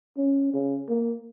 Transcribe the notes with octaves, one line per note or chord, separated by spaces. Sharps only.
C#4
C#3
A#3